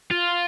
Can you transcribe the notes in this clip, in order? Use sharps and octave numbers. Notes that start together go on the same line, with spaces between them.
F4